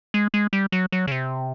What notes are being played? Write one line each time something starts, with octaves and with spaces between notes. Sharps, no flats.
G#3
G#3
G3
F#3
F#3
C#3
C3